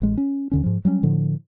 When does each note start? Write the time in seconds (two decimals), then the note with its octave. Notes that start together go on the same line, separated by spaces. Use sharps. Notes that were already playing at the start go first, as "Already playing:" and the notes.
0.02 A1 G#3
0.17 C#4
0.51 D#2 D3 C#4
0.63 G#2 F3
0.85 F#3 G3 A3 C#4
1.03 A2 D3 F3